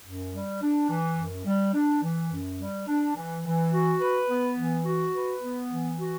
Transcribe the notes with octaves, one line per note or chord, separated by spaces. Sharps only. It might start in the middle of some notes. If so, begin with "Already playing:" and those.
F#2
G3
D4
E3
F#2
G3
D4
E3
F#2
G3
D4
E3
E3
F#4
B4
B3
E3
F#4
B4
B3
E3
F#4